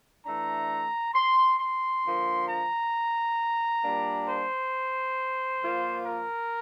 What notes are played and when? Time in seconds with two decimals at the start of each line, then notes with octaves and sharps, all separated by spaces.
0.25 E3 A3 D4 A#5
1.14 C6
1.59 C6
2.03 D3 F3 A#3
2.48 A#5
3.83 A#2 G3 A#3 D4
4.28 C5
5.61 A#2 F3 A#3 F4
6.06 A#4